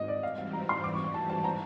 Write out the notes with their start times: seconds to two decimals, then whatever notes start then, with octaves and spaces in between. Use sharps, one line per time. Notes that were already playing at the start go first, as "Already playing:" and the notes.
Already playing: G#2 D#5
0.08 D5
0.23 G#2 E3 G3 C4 F5
0.38 F5
0.53 A#5
0.69 C6
0.84 D6
0.94 C#6
1.04 C#6
1.14 A5
1.30 A5
1.44 A#5